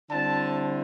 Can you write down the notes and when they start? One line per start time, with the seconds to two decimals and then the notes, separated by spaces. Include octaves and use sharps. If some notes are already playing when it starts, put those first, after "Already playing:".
0.09 D3 G3 C4 E4 A5